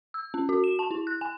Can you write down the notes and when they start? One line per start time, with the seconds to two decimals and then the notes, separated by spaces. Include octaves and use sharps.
0.14 E6
0.34 C#4
0.49 F#4
0.64 E7
0.79 A5
0.91 E4
1.07 F#6
1.21 G#5